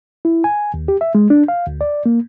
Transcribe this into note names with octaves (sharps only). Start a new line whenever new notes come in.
E4
G#5
D#2
G4
E5
G#3
D4
F5
D2
D5
A#3